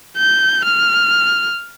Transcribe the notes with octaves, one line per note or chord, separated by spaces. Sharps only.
G6
F6